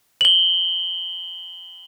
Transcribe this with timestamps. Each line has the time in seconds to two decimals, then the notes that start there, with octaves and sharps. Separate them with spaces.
0.21 F#7 G7